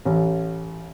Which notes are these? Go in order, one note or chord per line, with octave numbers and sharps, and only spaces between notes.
A1